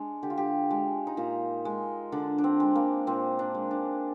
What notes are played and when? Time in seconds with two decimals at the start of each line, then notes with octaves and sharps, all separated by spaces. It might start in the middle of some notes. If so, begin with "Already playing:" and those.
Already playing: G#3 D4
0.23 D3 G4
0.30 F4
0.38 G4
0.71 G#3
1.07 D#4
1.17 A#2 F4
1.65 G#3
2.12 D3 D4
2.38 D4
2.44 C4
2.60 G#3
2.75 A#3
3.07 A#2 C4
3.39 D4
3.55 G#3
3.71 D4